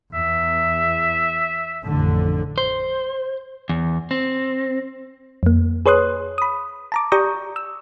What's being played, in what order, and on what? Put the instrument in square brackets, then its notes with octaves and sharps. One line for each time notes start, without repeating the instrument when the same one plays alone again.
[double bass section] E2 [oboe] E5
[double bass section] A1 F2 D3
[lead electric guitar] C5
E2
C4
[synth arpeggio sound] F2 A#3
G#4 B4 C#5 C6 D#6 F#6
B5 D#6
A5 A#5 D6
G4 D5 A#5 C#6 D#6 G6
E6